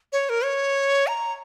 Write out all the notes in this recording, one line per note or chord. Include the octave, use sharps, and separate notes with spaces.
C#5
A#4
C#5
A#5